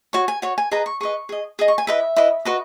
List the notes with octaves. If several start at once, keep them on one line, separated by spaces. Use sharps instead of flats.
F#4 C#5 C#6
G#5
F#4 C#5
G#5
G#4 B4 D#5 A#5
C#6
G#4 B4 D#5 C#6
G#4 D#5
G#4 D#5 D#6
C#6
G#5
E4 B4 D#5 E5
E4 B4 D#5
F#4 B4 D#5